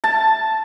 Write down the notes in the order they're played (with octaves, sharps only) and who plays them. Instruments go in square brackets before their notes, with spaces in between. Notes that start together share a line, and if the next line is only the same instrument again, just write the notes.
[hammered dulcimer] A5